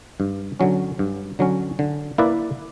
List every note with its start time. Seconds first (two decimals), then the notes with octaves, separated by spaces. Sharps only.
0.20 G2
0.60 D3 F#3 C#4
0.99 G2
1.39 D3 F#3 C#4
1.79 D3
2.18 A#3 E4 B4 D5